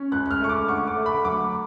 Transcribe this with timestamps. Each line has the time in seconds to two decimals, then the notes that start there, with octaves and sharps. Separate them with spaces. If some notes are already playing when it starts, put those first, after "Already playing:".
Already playing: C#4
0.12 C#2 F#6
0.26 F#6
0.31 F6
0.40 A3 C#6
0.49 D6
0.68 D3 C#6
0.87 D6
0.97 A3
1.06 B5
1.25 F#3 D6